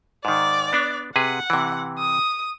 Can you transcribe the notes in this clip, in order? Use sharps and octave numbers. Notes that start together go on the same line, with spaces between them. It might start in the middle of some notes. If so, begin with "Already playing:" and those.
G#2 D#3 D5
B3 D4
C3 G#4 B4 F#5
C3 E3
D#6